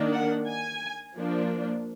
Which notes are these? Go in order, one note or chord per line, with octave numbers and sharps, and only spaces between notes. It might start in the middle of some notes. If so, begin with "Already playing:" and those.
Already playing: D#3 A#3 D4
F#5
G#5
F3 A#3 D4